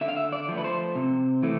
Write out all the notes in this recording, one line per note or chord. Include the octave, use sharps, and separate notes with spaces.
D3 E5
F5
E5
D5
F3 A3
B4
C5
C3
E3 A3